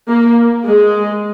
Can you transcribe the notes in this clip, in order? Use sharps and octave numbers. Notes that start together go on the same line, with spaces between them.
A#3
G#3